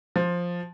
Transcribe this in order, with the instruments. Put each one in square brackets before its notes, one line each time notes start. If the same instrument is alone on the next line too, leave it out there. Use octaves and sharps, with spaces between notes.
[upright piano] F3